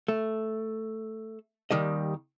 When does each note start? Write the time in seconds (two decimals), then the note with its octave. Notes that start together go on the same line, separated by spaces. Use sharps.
0.08 A3
1.71 D#2 D#3 G3 D#5